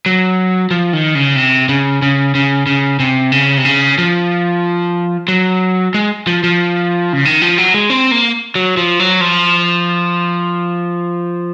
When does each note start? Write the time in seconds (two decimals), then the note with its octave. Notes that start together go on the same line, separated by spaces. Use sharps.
0.06 F#3
0.71 F3
0.93 D#3
1.15 C#3
1.36 C3
1.69 C#3
2.02 C#3
2.35 C#3
2.66 C#3
3.00 C3
3.32 C#3
3.57 C3
3.65 C#3
3.98 F3
5.28 F#3
5.94 G#3
6.27 F3
6.44 F3
7.13 C#3
7.25 D#3
7.42 F3
7.58 F#3
7.74 G#3
7.90 C4
8.11 A#3
8.55 F#3
8.77 F3
9.00 F#3
9.21 F3